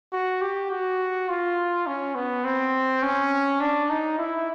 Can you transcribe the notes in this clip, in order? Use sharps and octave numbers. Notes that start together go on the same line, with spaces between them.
F#4
G4
F#4
F4
C#4
B3
C4
C#4
D4
D#4
E4